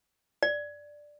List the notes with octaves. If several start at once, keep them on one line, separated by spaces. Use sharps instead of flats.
D5